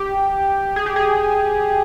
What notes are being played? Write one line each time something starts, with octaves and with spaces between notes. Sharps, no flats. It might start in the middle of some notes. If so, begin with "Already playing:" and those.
Already playing: G4
G#4
G4
G#4